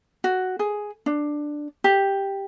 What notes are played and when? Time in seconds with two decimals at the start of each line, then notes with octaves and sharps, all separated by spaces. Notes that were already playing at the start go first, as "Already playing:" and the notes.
0.24 F#4
0.59 G#4
1.06 D4
1.84 G4